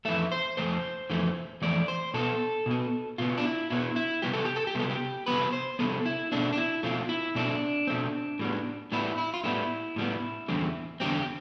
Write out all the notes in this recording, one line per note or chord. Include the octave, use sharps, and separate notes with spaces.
F2 E3 A3 E5
C5
F2 E3 A3 C5
F2 E3 A3
F2 E3 A3 D5
C5
B2 B3 A4
B2 B3
B2 B3 F4
D4
E4
B2 B3 E4
E4
C3 G3 B3 G4
A4
G4
A4
G4
C3 G3 B3 A4
G4
C3 G3 B3 B4
C5
C3 G3 B3 A4
E4
B2 A3 C4 D4
D4
E4
B2 A3 C4 F4
E4
B2 A3 C4 D4
B2 A3 C4
A2 G3 B3
A2 G3 B3 E4
E4
F4
A2 G3 B3 E4
A2 G3 B3
E2 D3 G3 C4
E2 D3 G3 C4 G4